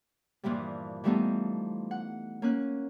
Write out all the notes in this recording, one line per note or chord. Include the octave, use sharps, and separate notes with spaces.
G2 A#2 E3 F3 G3
E3 F3 G3 A3 B3 D#4
F#5
A#3 C#4 F#6